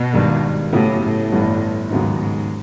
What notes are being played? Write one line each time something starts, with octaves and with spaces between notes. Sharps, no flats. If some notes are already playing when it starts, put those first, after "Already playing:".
Already playing: B2
G#1 G2 D#3 G3
A2 C#3 F#3 B3 E4 G4
A2
G1 G2 E3 G3 B3
D#2 G#2 C#3 F#3 B3 D#4
G#2